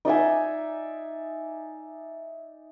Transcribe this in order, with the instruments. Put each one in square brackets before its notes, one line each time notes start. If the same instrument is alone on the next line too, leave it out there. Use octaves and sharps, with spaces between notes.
[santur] D#4 D5 E5 G#5